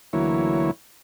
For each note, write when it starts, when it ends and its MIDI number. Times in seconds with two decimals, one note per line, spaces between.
0.13 0.71 38
0.13 0.71 52
0.13 0.71 54
0.13 0.71 58
0.13 0.71 64
0.13 0.71 73